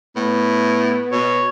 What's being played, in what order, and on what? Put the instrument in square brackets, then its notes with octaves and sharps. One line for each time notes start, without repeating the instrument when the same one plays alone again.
[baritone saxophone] A2 [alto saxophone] B3
[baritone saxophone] B2 [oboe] C#5